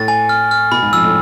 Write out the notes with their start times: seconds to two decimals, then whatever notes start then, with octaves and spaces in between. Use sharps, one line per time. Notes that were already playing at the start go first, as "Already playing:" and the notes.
Already playing: A2 A6
0.08 G#5
0.29 F6
0.51 F6
0.71 B2 B5
0.82 G#2
0.93 F2 E6
1.04 A2